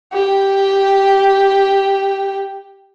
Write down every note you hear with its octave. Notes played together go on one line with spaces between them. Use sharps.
G4 G5